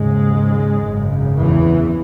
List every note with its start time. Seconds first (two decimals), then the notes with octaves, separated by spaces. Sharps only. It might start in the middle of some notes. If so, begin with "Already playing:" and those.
Already playing: D#2 G#2 C#3 G#3
0.82 G#1 F#2 C#3
1.38 E2 E3